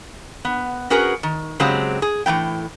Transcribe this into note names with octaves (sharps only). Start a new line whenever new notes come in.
B3
C#4 F#4 G#4 A#4 B4
D#3
C#3 F#3 G#3 C4 G4 G#4
G#4
A2 E3 B3 G5